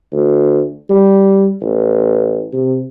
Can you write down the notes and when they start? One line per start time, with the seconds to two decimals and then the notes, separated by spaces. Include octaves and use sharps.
0.12 D2
0.90 G3
1.61 A1
2.53 C3